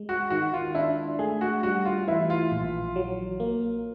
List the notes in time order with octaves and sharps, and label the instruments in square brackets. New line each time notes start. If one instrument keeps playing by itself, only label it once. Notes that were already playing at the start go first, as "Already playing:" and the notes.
Already playing: [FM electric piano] G#3
[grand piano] F#4
[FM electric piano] D#3 [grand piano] F#4
[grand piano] F4
[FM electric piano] D4 [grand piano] E4
[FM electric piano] A3 [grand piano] G#4
[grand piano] F#4
[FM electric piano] G3 [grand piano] F#4
[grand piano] F4
[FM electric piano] E3 [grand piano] E4
[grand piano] F4
[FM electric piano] A#1
F#3
A#3